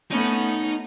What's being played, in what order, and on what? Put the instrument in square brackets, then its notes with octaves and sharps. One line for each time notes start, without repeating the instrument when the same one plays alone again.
[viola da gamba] A3 B3 C#4 [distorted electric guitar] D#4